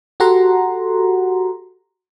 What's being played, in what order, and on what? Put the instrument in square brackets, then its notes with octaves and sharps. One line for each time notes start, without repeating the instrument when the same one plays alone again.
[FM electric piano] F#4 G4 A4 F#5 A#5 C6